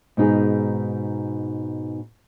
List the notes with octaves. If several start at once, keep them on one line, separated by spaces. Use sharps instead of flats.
G#2 B2 D#4 G#4